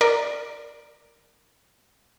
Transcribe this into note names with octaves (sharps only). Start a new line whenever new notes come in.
A#4 D5